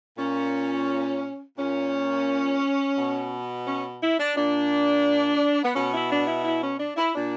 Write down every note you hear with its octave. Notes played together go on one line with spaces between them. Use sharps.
A#2 C#4
A#2 C#4
B2
C#4
E4
D4
A#2 D4
B3
B2 C#4
E4
D4
E4
E4
C#4
D4
E4
A#2 D4